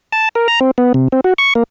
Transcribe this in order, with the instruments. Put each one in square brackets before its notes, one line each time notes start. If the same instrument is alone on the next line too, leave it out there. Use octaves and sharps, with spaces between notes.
[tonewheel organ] A5
A#4
A#5
C4
B3
C3
C4
F#4
C#6
A#3